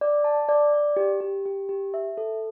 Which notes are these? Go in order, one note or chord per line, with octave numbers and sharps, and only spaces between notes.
D5
A5
D5
D5
G4
G4
G4
G4
E5
A4